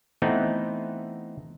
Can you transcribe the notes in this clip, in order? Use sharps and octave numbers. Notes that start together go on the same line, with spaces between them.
E3 A3 B3 C4 D#4